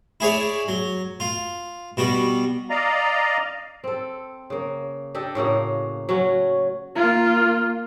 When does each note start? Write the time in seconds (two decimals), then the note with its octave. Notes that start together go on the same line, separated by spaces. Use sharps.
0.20 E4 G#4 C#5 D5
0.68 F#3
1.20 F4
1.97 B2 G3 F#4
2.70 D5 D#5 F5 A#5
3.84 C4 A4
4.50 C#3 A#3
5.15 D4 G4 A4 D#5
5.35 A2 C#3 A#3 F#4
6.09 F#3 C#4 F#4
6.96 A#3 F4